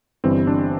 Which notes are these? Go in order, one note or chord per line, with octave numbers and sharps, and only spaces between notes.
G1 G2 E3 G3 C4
D4